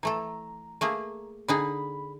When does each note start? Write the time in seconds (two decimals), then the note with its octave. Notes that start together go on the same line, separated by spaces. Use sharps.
0.03 E3 A3 A4 A#5
0.81 A3 A#3 G#4
1.48 D3 D#4 G#4 B5